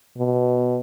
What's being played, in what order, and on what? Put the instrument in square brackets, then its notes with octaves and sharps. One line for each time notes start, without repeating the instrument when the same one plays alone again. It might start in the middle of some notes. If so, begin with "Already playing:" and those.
[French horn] B2